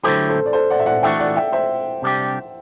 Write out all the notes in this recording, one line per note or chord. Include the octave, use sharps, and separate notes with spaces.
D3 F#3 A3 E4 G4 A4 C5
A4 C5
D5
A4 C5
D5 F#5
E5
D5 F#5
E3 A3 D4 F#4 E5 G5
D5 F#5
E5 G5
C5 E5
C3 G3 D4 G4